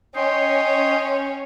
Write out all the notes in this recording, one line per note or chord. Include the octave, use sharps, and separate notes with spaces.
C#4 C#5 D#5 G5 C6